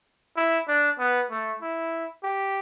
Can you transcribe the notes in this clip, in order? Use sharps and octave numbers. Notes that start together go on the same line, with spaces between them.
E4
D4
B3
A3
E4
G4